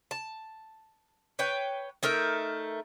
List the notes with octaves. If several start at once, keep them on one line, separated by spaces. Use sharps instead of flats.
A5
B4 C#5 G5
A3 D#4 A#4 E5